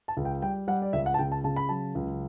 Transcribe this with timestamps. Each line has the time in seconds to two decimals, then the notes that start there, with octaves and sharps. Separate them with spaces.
0.08 A5
0.17 C#2
0.25 G5
0.42 G3 G5
0.68 G3 F#5
0.82 D5
0.93 C#2 E5
1.06 F#5
1.14 A5
1.19 C#3 G5
1.32 A5
1.44 C#3 A5
1.56 B5
1.69 F#3 A5
1.95 C#2